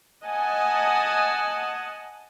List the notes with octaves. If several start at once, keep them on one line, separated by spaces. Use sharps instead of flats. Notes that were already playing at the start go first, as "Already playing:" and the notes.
D#5 F#5 G#5 A5